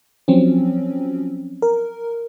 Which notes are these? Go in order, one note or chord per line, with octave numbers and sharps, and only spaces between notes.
F3 F#3 C4 C#4
A#4